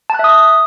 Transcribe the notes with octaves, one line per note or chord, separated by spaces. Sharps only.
E5 A5 D#6 F#6